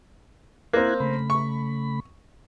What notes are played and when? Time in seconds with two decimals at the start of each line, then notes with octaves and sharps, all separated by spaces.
0.73 A#3 C4 E4 F#6 G#6
1.00 C#3 A3 B5
1.30 C#6